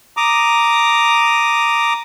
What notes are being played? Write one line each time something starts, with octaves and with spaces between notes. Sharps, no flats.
A#5 D6 D#6